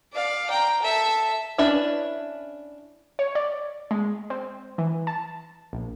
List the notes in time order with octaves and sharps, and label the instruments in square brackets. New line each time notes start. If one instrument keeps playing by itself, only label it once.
[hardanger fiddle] D5 F5
G5 A#5
A4 E5
[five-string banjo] C#4 D4 E4 B4 E5
[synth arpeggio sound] C#5
D5
G#3
C4
E3
A5
A#1